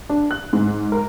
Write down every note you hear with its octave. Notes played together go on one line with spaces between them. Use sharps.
D4
F#6
G#2
A#4